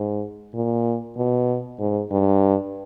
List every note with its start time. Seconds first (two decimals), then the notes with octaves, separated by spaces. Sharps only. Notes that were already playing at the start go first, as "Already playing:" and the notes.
Already playing: G#2
0.54 A#2
1.17 B2
1.80 G#2
2.11 G2